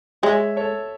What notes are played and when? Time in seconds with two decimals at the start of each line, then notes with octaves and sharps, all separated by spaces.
0.23 G#3 C#5 E5
0.57 A4 C#5